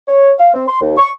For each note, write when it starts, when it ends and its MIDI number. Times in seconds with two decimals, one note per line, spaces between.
0.08 0.33 73
0.39 0.50 77
0.54 0.64 60
0.68 0.81 84
0.81 0.95 39
0.98 1.10 85